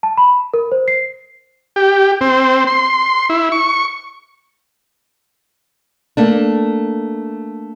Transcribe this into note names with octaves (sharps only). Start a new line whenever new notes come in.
A5
B5
A#4
C5
C7
G4
C4
C6
E4
C#6
A3 A#3 D4